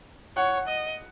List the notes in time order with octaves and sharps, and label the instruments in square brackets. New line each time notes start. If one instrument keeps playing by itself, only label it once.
[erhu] C#5 [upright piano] F#5
[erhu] D#5